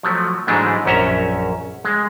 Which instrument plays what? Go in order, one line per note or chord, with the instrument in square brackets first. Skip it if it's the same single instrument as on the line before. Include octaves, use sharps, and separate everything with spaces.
[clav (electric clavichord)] F3 F#3 A3
G#2 E3 F#3 G#3 A3 D4
A#1 F#2 C#4 E5 A#5
G#3